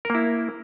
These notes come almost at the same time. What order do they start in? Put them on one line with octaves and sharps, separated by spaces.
A#4 A#3 E4